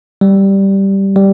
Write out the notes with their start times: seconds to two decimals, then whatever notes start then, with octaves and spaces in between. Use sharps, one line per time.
0.21 G3
1.16 G3